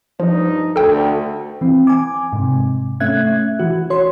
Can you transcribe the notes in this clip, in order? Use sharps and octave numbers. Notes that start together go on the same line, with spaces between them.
G2 F3 D#4
D2 A4 G5
E3 C4
G#5 D6
G#2 C3
A3 C#4 E5 F#6 G#6
E3 F#4
F#4 C#5 C6